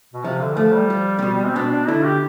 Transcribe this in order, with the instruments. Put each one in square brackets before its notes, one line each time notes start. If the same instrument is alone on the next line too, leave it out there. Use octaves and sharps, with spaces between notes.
[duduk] B2
[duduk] C3 [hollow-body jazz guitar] F3
[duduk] D3
[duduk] F3 [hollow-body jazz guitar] A3
[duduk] G3
[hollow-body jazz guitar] F3
C3
B2
[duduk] C4
[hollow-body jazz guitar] B2 [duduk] D4
[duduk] D4
[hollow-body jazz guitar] D3 [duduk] E4
[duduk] G4